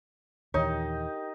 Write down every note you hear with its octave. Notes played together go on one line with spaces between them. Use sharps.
D#2 A#2 E3 D#4 G4 A#4 C#5 G5